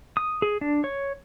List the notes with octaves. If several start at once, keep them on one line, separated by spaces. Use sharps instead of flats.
D#6
G#4
D4
C#5